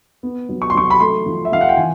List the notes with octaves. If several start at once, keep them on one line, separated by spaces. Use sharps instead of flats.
B3
F#3
C#6
C6
F#3 C#6
B5
A3 C6
F3
E5
F3 F5
F#5
G5
E3 G#5